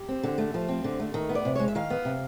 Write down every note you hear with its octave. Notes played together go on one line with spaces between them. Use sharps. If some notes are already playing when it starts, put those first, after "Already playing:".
Already playing: G4
C4
D3
A3
F3
C4
D3
A3
D#3
B3
D5
C3
G#3 C#5
E5
D#3 F5
B3
C3